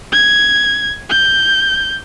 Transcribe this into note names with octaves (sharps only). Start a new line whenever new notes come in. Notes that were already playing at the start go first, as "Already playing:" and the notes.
G#6
G6